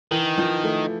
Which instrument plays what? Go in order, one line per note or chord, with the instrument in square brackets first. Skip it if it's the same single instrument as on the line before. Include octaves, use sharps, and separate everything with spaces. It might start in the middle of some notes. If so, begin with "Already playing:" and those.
[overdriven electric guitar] D#3 [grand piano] E3
[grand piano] F3
A3